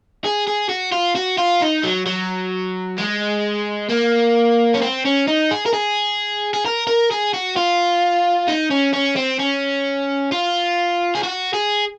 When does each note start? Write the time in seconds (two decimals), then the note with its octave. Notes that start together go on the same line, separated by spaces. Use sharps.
0.24 G#4
0.47 G#4
0.69 F#4
0.92 F4
1.15 F#4
1.38 F4
1.62 D#4
1.84 F#3
2.06 F#3
2.98 G#3
3.90 A#3
4.74 C#4
4.82 C4
5.05 C#4
5.28 D#4
5.51 G#4
5.66 A#4
5.73 G#4
6.54 G#4
6.66 A#4
6.87 A#4
7.11 G#4
7.34 F#4
7.56 F4
8.48 D#4
8.71 C#4
8.94 C#4
9.16 C4
9.40 C#4
10.32 F4
11.15 G#4
11.23 F#4
11.54 G#4